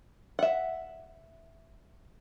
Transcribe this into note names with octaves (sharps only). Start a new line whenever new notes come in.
E5 F#5